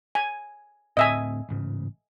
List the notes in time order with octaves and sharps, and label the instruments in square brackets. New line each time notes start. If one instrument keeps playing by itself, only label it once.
[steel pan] G#5
[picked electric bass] D2 A2 C4 [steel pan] D#5 E5 G#5
[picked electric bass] A1 G#2 C#3